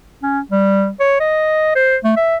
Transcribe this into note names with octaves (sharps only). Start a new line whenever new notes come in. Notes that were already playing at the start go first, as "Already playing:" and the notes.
C#4
G3
C#5
D#5
C5
A3
E5